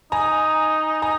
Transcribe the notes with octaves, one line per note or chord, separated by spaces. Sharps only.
D#4 G#5 A#5
G#5 A#5